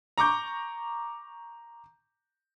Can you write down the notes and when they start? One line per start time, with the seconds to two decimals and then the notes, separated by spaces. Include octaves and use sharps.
0.18 A#5 C#6 D6 G6